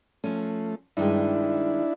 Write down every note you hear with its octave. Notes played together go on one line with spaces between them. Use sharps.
F3 A3 C#4
G2 D#3 G#3 D4 E4